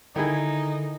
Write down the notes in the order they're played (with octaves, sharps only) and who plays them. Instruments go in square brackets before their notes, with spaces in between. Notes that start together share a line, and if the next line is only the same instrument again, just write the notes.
[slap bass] D3 [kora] D#3 E4 G#4 [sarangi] D#4